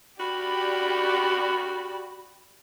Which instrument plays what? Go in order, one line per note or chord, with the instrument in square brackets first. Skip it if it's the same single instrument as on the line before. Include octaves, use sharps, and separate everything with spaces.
[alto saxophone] F#4 [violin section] G4 D5 [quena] B5